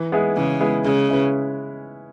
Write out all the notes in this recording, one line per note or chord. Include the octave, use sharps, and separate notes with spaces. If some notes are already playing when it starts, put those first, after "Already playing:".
Already playing: E3
G#3 B3 E4 G#4
C#3 E3
G#3 B3 E4 G#4
C#3 G#3
C#4 E4 B4